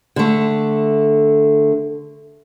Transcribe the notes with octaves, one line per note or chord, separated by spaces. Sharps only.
D3 A3